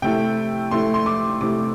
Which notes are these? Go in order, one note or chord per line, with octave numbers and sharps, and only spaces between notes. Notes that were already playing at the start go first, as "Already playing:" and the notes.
C3 A3 E4 G5
C3 A3 E4 C6
C6
D6
C3 A3 E4 D6